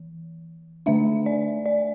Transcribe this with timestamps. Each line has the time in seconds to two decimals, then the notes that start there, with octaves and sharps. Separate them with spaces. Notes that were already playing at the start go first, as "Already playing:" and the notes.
Already playing: E3
0.86 D3 A3 D4 E5
1.26 D5
1.66 D5